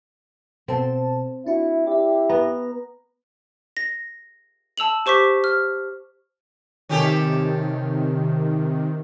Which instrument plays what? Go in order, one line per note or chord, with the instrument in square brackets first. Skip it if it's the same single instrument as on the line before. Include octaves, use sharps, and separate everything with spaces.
[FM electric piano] B2 A4 A5 [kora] C4
[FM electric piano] D4 F#4 [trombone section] E4
[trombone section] E4 G4 [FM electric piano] D5 E5
[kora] B3 [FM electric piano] A#5
[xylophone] A#6
A5 E6 F7 F#7
G4 C5 C#6 D6 B6
F6
[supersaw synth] C3 D#3 [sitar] C#4 G4 A4